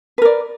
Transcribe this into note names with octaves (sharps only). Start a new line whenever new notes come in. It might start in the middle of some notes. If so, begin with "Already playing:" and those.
A#4 B4 D5